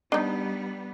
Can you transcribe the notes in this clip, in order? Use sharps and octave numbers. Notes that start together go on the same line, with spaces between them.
G3 B3 D4 D#4